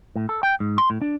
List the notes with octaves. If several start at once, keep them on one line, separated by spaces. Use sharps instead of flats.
A2
A4
G5
G#2
C6
A2
D4